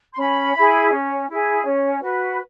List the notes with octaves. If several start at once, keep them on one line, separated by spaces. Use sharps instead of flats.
C6
C#4 B5
E4 G#4
C#4
E4 G#4
C#4
F#4 B4